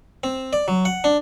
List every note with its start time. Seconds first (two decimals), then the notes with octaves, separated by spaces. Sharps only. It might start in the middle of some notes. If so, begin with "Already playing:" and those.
0.24 C4
0.53 D5
0.68 F#3
0.85 F#5
1.04 D4